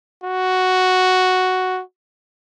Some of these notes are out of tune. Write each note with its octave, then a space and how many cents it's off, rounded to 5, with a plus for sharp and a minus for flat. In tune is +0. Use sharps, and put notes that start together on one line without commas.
F#4 +0